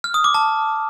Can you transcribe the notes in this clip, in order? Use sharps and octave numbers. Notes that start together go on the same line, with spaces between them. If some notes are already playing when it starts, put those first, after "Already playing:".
F6
D#6
D6
A5